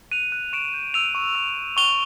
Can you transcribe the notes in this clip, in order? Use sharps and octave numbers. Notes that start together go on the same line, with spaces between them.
F#6 D#7 F7
F#6
C#6 D7 E7
G6
E6 D#7 F7
C#6
E6
C#6
C#6 F7 G7